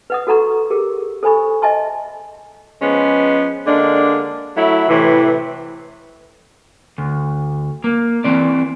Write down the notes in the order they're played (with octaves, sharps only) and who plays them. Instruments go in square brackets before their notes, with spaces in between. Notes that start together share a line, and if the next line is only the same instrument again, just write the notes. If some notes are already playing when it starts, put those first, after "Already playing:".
[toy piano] B4 F#5 D#6
F#4 A4 F#5 A#5 C#6
G4 G#4 A#4
A4 C5 G#5 B5 C#6
D#5 E5 G#5 A5 C6
[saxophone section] F3 G#3 B3 C#4
D3 G#3 A#3 D4
F#3 A3 E4
A2 C3 E3
[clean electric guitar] D2
A#3
E3 C4 D5